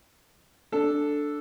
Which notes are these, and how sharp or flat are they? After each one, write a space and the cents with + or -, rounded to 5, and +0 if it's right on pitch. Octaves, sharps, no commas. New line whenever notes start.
D4 +0 A4 +0